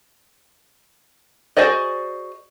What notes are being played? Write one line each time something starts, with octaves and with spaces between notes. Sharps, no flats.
F#4 G#4 C5 D5 D#5